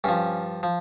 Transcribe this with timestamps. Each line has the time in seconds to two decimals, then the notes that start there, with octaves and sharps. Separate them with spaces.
0.04 G2 F3 C#4
0.63 F3